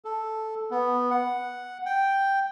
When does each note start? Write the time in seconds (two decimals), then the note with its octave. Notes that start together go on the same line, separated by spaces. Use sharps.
0.05 A4
0.71 B3
1.11 F#5
1.86 G5